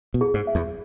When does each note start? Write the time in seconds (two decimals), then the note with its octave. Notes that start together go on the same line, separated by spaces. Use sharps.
0.14 B2
0.21 G#4
0.34 G#2
0.47 E5
0.55 E2